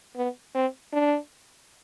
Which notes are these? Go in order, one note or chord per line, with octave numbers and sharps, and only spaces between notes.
B3
C4
D4